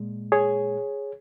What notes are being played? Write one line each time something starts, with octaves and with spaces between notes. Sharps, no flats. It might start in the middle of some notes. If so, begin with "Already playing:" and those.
Already playing: A#2 G#3
G#4 C#5